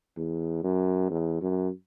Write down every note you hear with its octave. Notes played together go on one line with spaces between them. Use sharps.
E2
F#2
E2
F#2